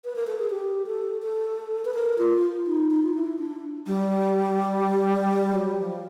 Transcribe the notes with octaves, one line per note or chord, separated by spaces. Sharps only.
B4
A#4
A4
G#4
G4
A4
A4
B4
A#4
F4
D#4
D#4
F4
E4
D4
G3
F#3
F3